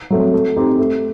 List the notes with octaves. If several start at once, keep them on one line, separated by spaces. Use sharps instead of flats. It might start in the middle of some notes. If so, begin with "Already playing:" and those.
F#3 A3 C4
A3
C4 D#4 G4
A3